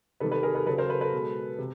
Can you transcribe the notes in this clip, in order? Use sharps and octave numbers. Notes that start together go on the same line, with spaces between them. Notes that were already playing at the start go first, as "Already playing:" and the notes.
C3 D#3 G3 A4 B4
A4 B4
G#4 A#4
A4 B4
C#3 F#3 A4 B4
A#4 C5
A4 B4
A4 B4
B2 G#3
C3